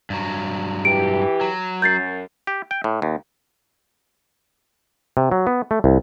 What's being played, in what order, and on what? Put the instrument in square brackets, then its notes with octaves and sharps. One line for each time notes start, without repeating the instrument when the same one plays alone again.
[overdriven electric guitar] G2 F#3
[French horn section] E3 G4 [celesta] D7
[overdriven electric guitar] F#3
[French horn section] F#2 [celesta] G6 A6 C7
[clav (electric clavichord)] G4
G5
A2
D#2
C3
F#3
B3
A3
C2